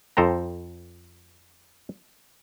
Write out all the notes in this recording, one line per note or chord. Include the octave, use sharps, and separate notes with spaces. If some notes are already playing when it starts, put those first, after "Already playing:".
F2 A4 C5 G5 A#5